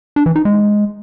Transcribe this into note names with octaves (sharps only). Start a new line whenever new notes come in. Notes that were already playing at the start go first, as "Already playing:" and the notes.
D4
E3
D#4
G#3